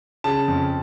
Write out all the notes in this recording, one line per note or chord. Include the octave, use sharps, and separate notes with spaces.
C#3 A5
F2